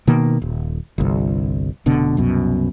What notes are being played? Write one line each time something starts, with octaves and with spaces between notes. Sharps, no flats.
B2 D#3 A#3
D#1
G1 C2
F1 B2 D3
C2 F#2 B2